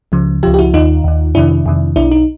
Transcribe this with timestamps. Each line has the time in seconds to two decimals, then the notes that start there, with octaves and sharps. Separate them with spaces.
0.12 C#2 C#3 F3
0.43 C#2 C#3 F3 F4 G4
0.54 G4
0.59 E4 F#4
0.74 D#2 D#3 D#4 F4
1.04 D#2 D#3
1.35 F2 C3 D#3 D4 E4
1.66 F2 C3 D#3
1.96 B1 B2 D4 E4
2.12 D#4